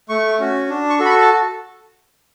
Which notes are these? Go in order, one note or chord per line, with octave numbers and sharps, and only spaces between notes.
A3 C#6
C#4 F#4
D4
C#6
F#4 A4
B5
C#6
A5